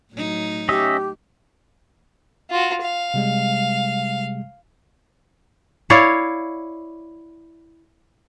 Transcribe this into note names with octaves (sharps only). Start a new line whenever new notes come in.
A2 F#3 D#4
C#4 G4 D#5 E5
F4 F#4
F5
C3 G3 G#3
E4 C#5 D5 F5